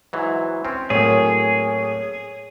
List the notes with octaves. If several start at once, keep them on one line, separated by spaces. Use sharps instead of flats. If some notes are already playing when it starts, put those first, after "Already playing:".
G#2 E3 F#3
C4 C#4 C6
A2 F#3 A#3 G#4 C#5